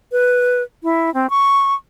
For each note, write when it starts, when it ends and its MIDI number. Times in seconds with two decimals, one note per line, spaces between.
0.12 0.62 71
0.83 1.12 64
1.14 1.29 60
1.30 1.74 85